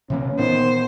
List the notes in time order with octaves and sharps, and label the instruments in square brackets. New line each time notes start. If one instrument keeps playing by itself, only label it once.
[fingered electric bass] C3 E3 A#3 [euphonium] C#4
[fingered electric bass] A#2 B3 [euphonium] D#3 [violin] C5